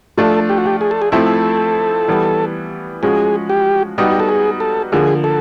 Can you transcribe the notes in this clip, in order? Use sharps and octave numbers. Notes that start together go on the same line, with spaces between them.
F3 A3 D4 F4 A4
G4
F#4
G4
G#4
A4
G#4
F3 A3 C4 E4 A4
E3 G3 B3
F3 G#3 C#4 F#4 G#4
G4
G3 B3 D#4 F#4 G4
A4
G#4
A4
D3 F3 A#3 G#4
A4